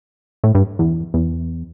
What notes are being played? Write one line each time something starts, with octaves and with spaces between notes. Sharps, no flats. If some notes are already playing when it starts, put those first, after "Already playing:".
A2
G2
E2
E2